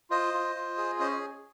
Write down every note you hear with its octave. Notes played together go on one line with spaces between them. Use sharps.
F4 C5 D#5
F4
F4
G#4
C#4 C5 D#5